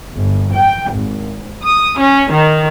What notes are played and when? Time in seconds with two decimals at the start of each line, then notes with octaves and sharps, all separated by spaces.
0.14 G1
0.53 G5
0.92 G#1
1.63 D#6
1.99 C#4
2.31 D#3